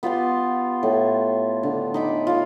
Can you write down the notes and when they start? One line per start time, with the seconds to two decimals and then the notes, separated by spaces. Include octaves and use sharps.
0.03 B3 F4 G4 C6
0.83 A2
1.63 D3
1.94 D#4 B5 D6
2.27 F4 F5